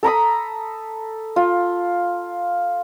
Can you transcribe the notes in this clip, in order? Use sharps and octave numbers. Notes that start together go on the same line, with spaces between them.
A4 A#5 B5 D#6
F4